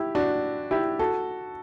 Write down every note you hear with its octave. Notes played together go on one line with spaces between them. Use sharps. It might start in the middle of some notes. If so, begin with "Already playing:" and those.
Already playing: E4 G4
D4 F#4
E4 G4
F#4 A4